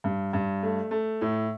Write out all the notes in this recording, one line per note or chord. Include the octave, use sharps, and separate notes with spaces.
G2
G2
A3
A3
A2